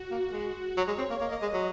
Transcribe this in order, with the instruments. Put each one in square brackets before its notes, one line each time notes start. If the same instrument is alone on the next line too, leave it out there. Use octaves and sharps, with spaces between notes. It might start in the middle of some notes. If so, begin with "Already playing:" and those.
Already playing: [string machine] F#4
[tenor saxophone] A#3
G#3
[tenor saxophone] F#3 [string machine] C#5
[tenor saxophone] G#3
C4
A#3
[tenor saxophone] A#3 [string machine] D#5
[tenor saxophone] A#3
G#3
F#3